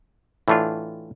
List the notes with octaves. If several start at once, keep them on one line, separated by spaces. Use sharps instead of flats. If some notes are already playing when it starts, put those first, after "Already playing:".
A2 E3 A3 D4 F4